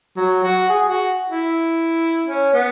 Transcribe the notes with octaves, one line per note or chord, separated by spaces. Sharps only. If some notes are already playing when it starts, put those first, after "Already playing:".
F#3
F#4
G#4
F#4
E4
C#4
B3